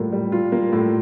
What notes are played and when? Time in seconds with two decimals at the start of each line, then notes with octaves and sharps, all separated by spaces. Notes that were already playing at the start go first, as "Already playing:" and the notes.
Already playing: A2 G3 A#3 F4
0.12 G3
0.32 F4
0.52 A#3
0.73 A2